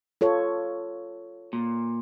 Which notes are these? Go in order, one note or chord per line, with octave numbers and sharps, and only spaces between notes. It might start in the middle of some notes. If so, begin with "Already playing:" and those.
F4 A4 C#5
A#2